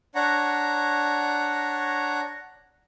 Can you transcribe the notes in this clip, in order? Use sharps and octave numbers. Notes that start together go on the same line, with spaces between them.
D4 C#5 F#5 A#5